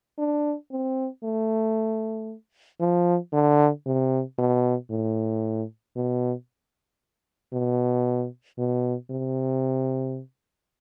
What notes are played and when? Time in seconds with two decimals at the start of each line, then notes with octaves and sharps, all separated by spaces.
0.18 D4
0.71 C4
1.23 A3
2.80 F3
3.33 D3
3.86 C3
4.38 B2
4.90 A2
5.96 B2
7.53 B2
8.58 B2
9.10 C3